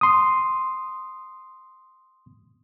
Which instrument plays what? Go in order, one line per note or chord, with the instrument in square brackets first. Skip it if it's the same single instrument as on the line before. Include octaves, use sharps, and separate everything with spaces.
[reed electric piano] C6 D#6